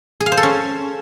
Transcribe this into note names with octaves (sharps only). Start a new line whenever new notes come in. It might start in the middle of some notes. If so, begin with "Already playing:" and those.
G#4
F5
C5
A4
C#4